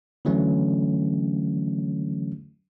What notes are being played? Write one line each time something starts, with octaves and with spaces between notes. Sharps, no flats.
D3 E3 F#3 A3 C#4